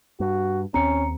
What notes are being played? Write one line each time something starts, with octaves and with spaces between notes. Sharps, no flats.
G2 F#4
D#2 C4 C#4 A#5 C#7